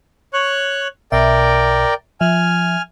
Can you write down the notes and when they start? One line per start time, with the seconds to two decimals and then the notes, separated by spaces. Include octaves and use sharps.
0.33 C#5 C#6 F#6
1.12 B1 B2 A#4 D5 E5 G5
2.21 F3 E5 G#5 F6